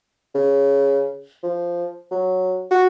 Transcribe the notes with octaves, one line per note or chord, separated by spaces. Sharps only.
C#3
F3
F#3
F#4